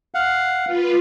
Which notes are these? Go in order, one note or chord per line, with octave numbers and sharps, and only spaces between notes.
F5 F#5
F4 B4